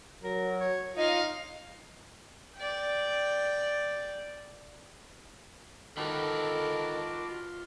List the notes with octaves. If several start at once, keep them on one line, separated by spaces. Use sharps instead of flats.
F#3 A#4
C#5
D#4 F4 D#5 F5
D5 G5
D#3 F4 F#4 A4 B4 A5 D6